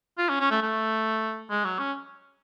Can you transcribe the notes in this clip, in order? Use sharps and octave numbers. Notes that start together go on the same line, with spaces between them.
F4
C#4
C#4
A3
A3
G#3
F#3
C#4